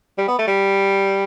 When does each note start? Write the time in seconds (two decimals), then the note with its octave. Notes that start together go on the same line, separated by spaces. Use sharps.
0.18 G3
0.28 B3
0.38 A3
0.47 G3